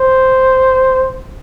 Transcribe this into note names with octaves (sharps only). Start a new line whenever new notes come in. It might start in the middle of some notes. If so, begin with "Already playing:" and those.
Already playing: C5